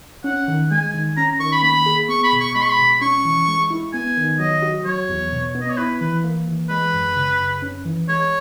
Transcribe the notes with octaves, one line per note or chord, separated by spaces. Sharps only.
C#4 F#5
D#3
G#3 G#5
D#3
C#4 A#5
D#3 C#6
B5
A#3 B5
G#4
B3 C#6
B5
B2
C#6
G#3 B5
C#6
B5
B2
C#4 C#6
E3
G#3
E4
B3 G#5
D#3
F#3 D#5
F#4
F#3 C#5
E2
B2
B3
D#5
C#5
E4 B4
E3 B4
A#3
E3
G#3 B4
F#2
C#3
F#2
C#4
E3
G#3 C#5